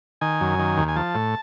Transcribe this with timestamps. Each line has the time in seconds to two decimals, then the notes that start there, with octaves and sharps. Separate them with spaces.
0.21 D#3 G#5
0.41 F#2
0.59 D#3
0.77 D#2
0.88 G#5
0.96 F3 A5
1.15 A2